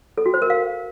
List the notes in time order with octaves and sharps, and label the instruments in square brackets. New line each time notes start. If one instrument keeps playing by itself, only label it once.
[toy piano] A4
F#4
C5
A#4
F5